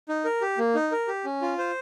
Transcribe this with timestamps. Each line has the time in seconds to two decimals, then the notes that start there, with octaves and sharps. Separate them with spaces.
0.09 D#4
0.25 A#4
0.41 G4
0.58 A#3
0.75 D#4
0.92 A#4
1.08 G4
1.25 C#4
1.42 F4
1.58 C5